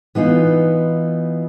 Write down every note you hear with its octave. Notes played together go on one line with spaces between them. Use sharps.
E3 B3 D#4 F4